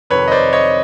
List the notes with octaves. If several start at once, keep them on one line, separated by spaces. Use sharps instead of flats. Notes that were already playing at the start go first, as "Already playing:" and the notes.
F2 C3 D#3 B4 C#5
D#5
C5 D5
C#5 D#5